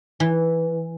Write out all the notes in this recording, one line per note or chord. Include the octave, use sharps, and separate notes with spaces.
E3